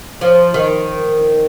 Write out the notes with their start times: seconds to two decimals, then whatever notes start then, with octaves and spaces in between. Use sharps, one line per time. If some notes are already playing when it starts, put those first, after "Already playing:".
0.21 F3
0.54 D#3